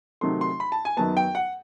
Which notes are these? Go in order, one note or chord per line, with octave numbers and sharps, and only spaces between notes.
C3 D#3 F#3 A3 C6
C6
B5
A5
G#5
F#2 D#3 F#3 B3 A5
G5
F#5